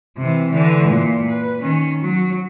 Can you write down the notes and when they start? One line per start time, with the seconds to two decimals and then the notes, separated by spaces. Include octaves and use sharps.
0.17 C3 E3
0.51 D3 E3
0.89 A#2
1.28 B4
1.62 D#3 C#4
2.02 F#3